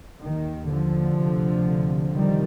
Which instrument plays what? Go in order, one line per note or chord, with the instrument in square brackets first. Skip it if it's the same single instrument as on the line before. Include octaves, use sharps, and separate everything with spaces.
[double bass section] D#2 D#3
D3 F3
D2 C3
F2 C3 D#3 G3